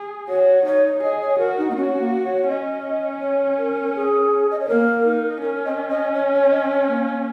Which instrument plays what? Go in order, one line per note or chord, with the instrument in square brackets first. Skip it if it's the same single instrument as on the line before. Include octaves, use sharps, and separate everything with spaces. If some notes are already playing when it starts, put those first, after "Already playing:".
Already playing: [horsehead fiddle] G#4
[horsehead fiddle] F#4 [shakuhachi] C#5
[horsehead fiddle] D#4 [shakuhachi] C#5
[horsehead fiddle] G#4 [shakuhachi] D#5
[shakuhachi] C#5
[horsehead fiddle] F#4 [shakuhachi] A#4
[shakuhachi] D#4
A#3
[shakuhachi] C#4 [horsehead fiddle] F#4
[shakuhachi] A#3
C#5
[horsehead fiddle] C#4 [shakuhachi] D#5
[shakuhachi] C#5
A#4
A#4
G#4
D#5
C#5
[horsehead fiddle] A#3 [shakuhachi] A#4
[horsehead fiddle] D#4
[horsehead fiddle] C#4 [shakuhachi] A#4
[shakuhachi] D#5
D#5
C#5
C#5
D#5
C#5
A#3